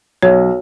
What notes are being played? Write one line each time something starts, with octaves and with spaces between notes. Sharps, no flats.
B1 C#5